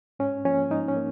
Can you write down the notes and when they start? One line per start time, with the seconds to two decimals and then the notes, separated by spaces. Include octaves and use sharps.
0.19 G#2 C#4
0.45 F3 A#3 C#4
0.71 G#2 D#4
0.88 C#4
0.96 A#3